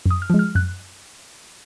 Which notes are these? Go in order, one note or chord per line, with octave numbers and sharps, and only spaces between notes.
F#2 D#6
F6
F3 G#3
F6
F#2 F#6